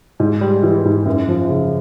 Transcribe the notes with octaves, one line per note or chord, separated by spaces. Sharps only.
G#2
G3
E3
G#2
F#2
F3
C#3